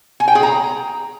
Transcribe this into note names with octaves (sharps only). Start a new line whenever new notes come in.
G#5
G5
G#4
A#5